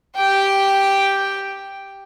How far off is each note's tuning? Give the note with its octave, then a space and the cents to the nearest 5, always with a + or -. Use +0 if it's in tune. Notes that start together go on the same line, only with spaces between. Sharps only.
G4 +0 G5 +0